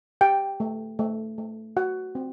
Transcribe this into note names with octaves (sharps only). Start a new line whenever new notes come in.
G4 G5
A3
A3
A3
F#4 F#5
C4